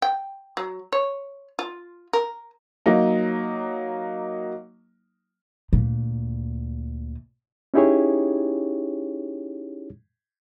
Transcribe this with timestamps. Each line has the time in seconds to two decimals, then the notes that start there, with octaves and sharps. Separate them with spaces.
0.02 G5
0.57 F#3
0.92 C#5
1.59 F4
2.13 A#4
2.86 F#3 A#3 D#4
5.73 D2 A#2
7.74 C#4 D#4 E4 G4 G#4 C#5